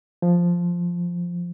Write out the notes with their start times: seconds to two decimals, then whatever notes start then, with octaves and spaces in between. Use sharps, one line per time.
0.22 F3